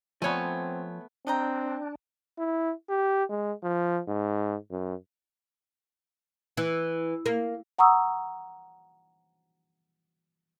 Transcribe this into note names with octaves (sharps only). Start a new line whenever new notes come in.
F3 A3 B3 C4 C#5 G#5
C4 D4 D#5 G5 A#5
E4
G4
G#3
F3
G#2
F#2
E3
A#3
F#5 A#5 C#6 D#6 E6